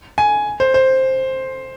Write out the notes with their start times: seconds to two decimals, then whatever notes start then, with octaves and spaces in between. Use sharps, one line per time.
0.18 G#5
0.60 C5
0.74 C5